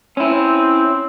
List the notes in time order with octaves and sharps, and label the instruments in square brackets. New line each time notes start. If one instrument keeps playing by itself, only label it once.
[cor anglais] C4 [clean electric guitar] C#4 E4